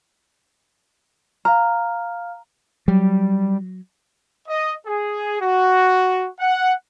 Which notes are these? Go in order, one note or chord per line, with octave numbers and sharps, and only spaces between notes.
F5 A#5 F6
F#3 G3
D#5
G#4
F#4
F#5